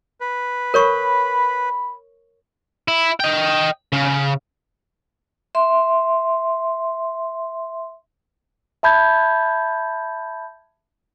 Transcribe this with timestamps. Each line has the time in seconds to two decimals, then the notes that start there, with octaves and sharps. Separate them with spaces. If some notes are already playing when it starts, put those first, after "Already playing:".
0.21 B4
0.74 A#4 C#5 B5 C#6
2.88 E4
3.20 D#5 G5
3.92 C#3
5.55 E5 C6
8.83 E5 A5 B5 G6 G#6